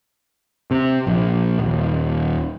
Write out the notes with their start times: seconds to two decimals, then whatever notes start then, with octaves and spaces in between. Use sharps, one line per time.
0.71 C3
1.07 A#1
1.59 D#1